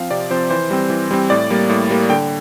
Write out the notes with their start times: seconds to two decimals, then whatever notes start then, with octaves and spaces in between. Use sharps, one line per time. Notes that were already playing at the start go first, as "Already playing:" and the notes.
Already playing: F3 C4 F5
0.11 C3 D5
0.30 F3 C4 C5
0.50 E3 C5
0.70 G3 C4
0.90 E3
1.11 G3 C4
1.30 A2 D5
1.50 G3 A#3
1.69 A2
1.90 G3 A#3
2.10 D3 G5